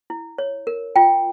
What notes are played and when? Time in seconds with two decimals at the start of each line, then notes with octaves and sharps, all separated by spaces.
0.10 E4
0.38 C#5
0.67 A#4
0.96 F4 G5